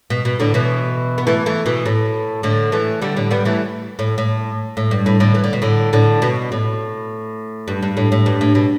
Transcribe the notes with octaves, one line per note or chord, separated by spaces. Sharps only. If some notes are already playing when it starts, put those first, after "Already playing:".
B2
B2
A2 D3
B2 E3
B3
E3 A3
E3 A3
B2 E3
A2
A2 D3
E3 A3
D3 G3
A2 D3
G3 B3
E3 A3
A2
A2
A2
G2
A2
A2 D3
E3
D3
B2
A2 D3
A2 D3
B2
A2
G2
G2
A2
A2
G2
A2
B2